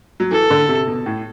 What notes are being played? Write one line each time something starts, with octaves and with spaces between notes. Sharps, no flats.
F#3
E3 A4
D3
C3
B2
A2